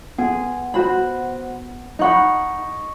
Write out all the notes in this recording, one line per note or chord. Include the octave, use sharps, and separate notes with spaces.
B3 G#4
F#4 C5 B5
D#4 D#5 F#5 B5 C#6